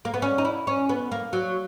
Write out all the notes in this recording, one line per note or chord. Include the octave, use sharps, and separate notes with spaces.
A#3
B3
C#4
D#4
E4
C#4
B3
A#3
F#3